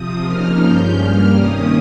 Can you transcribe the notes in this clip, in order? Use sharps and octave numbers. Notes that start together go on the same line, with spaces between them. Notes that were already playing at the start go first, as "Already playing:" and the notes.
Already playing: C3 F3 C4 D#6
C#3 F3 A#3 D#4 F6
G2 F3 G#3 C#4 G6
G2 G3 A#3 F6
C3 D#3 A#3 C#4 D#6